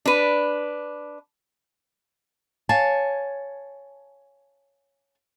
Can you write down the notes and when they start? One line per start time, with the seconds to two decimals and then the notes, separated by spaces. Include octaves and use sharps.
0.06 D4 B4
2.69 C#5 F5 G#5 A5